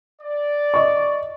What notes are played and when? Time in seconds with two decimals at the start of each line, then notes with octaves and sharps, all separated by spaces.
0.22 D5
0.74 D#5 C#6